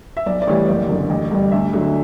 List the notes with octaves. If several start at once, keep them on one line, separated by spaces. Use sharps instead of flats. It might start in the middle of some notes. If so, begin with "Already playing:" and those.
E5
B1 D5
D5
A2 E3 G3 C#5
F#1 D5
F#2 D3
A1
G2 D3 G3
D2 E5
D3 F#3